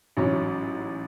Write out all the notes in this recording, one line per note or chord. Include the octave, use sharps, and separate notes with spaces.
A1 G#2 F#3 C#4